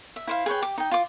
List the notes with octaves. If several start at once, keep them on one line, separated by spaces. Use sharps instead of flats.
E5
E4 C5 F5
G#4 B4 C#5 G5
G4 D6
D#4 G5
F4 D6